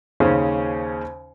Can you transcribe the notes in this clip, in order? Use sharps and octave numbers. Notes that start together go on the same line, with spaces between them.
D#2 C#3 C#4 C5